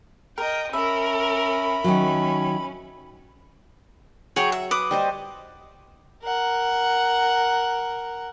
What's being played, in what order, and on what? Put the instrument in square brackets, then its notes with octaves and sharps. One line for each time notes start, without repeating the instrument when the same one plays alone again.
[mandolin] A#4 [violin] D#5 G5
[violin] C#4 A#4 [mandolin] E5 [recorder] B5
[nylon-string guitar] D#3 F#3 [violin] C#4
[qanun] F#3 [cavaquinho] G#4 C#5 G5
[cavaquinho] E5
B4 D6 D#6
[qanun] G3 C5 D#5
[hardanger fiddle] A#4 F#5